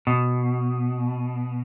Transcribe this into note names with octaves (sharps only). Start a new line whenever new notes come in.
B2